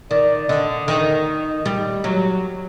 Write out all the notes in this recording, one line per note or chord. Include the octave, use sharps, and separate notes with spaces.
D#3 D5
D3 D#5
D#3
G3
F#3